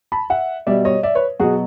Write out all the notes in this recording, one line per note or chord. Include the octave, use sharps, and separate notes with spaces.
A5 B5
E5 F#5
B2 G3 D5 E5
C#5 D#5
D5 E5
B4 C#5
B2 F#3 F#4 G#4